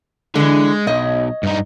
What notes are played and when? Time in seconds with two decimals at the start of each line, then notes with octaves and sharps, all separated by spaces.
0.35 D3 E3 G#3
0.87 B1 C#5 D#5
1.43 G2 D#4